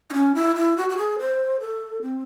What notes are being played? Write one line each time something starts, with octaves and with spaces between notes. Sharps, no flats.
D#4
C#4
E4
E4
F#4
F#4
G#4
C5
A4
C4